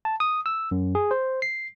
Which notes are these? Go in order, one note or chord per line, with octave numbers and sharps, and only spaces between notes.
A5
D#6
E6
F#2
G#4
C5
C7